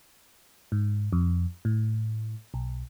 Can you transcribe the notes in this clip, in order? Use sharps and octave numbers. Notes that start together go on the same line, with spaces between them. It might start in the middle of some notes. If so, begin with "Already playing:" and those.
G#2
F2
A2
B1